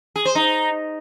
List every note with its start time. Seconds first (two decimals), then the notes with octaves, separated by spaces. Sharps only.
0.16 G#4
0.25 C5
0.35 D#4